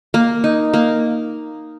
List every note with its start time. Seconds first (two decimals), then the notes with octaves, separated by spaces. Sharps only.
0.14 A#3
0.44 D#4
0.74 A#3